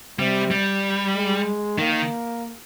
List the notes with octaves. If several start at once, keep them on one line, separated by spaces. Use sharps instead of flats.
C3 G3
G3
G#3
D#3 A#3